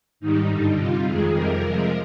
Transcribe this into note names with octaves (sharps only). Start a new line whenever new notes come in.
G#2 D#3 G3 D#4
G2 D3 G3
C3 G3 F4
F2 D#3 G#3 G#4
F2 C3 G3 A#4
C3 F3 G#3